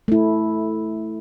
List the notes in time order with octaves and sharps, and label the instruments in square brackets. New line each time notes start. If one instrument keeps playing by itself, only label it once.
[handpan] A3 E4